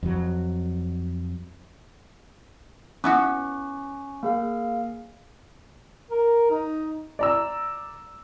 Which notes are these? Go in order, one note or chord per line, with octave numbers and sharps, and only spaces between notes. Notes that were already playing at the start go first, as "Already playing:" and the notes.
F2 F#3
B3 C#4 E4 F#4 C#6
A#3 G#4 F5
A#4
D#4
D5 A#5 E6